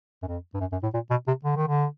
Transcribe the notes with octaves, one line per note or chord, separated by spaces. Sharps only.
F#2
F2
G2
F#2
F#2
A2
A#2
B2
C3
D3
D#3
D3